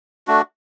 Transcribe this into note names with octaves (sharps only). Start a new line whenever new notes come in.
A3 D4 F#4